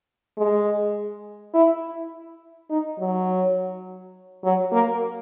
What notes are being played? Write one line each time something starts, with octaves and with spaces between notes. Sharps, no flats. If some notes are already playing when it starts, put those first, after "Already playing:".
G#3
E4
D#4
F#3
F#3
A#3